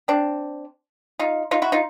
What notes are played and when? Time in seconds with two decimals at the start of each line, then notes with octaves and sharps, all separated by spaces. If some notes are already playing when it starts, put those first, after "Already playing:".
0.08 C4 D4
1.19 D#4 F4
1.51 D#4 F4
1.62 E4 F#4
1.72 D#4 F4